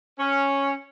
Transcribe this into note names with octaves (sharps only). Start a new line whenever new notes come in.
C#4